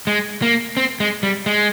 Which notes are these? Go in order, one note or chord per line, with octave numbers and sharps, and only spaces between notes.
G#3
A#3
C4
G#3
G3
G#3